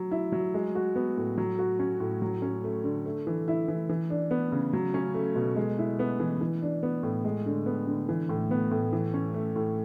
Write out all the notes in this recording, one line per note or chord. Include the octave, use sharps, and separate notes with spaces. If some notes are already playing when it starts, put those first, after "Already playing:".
Already playing: F#3
E4
F#3
G#3
F#4
B3
A2
F#3
F#4
C#4
A2
F#3
C#4
A3
D3
A3
E3
E4
E3
E3
D4
B3
C#3
F#3
C#4
A3
B2
G#3
E4
B3
E3
E3
D4
B3
A2
G#3
D3
B3
D3
E3
A2
B3
A2
E3
C#4
A3
A2